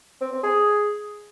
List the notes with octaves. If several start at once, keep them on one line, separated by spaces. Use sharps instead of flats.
C4
C4
G#4